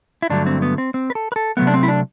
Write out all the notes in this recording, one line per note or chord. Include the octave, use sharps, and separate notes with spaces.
E4
G2 D3 F#3 A3 D4
C4
B3
C4
C4
B4
A4
B4
A4
C3 F#3 A3 B3
D4
C4
E4
D4